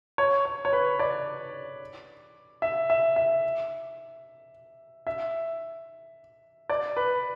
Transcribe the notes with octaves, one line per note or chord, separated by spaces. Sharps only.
C#5
C#5
C#5
B4
D5
E5
E5
E5
E5
D5
B4